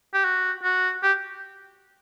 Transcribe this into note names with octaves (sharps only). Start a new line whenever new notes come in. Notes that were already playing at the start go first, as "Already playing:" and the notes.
G4
F#4
F#4
G4